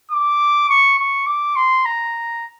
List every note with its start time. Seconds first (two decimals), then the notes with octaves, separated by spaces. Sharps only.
0.11 D6
0.69 C#6
0.98 C#6
1.26 D6
1.56 C6
1.85 A#5